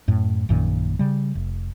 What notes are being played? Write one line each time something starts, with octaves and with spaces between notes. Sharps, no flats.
F#2 A2
A#1 F#2 A#2 D#3
C#3 G3
F1